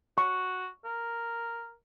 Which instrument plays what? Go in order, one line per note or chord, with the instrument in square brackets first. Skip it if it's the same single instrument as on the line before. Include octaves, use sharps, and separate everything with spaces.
[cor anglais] F#4 [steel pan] C#6
[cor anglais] A#4